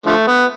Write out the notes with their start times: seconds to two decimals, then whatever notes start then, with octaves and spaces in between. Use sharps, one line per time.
0.06 D3 F3 A3
0.27 B3